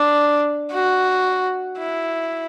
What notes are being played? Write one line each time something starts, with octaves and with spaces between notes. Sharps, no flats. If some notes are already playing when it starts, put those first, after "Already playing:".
Already playing: D4
F#4
E4